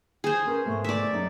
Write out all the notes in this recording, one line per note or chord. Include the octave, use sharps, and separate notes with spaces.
G#4 C5
C#4 A#4 B4
G#2 B2 A3
D5 E5
F#2 G#3 D#4